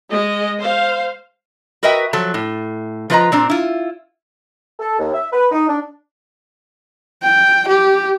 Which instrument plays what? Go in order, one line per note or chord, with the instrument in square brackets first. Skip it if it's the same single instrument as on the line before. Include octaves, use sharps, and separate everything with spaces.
[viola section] G#3 D#5
C5 F5
[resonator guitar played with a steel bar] F#4 A#4 B4 D#5 E5 G5
F3 F#3 A4
A2
F3 F4 B4 D5 D#5 A#5
A#2 C4 D4 A#5
E4 F4
[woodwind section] A4
D#2
E5
B4
D#4
D4
[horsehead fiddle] G5
G4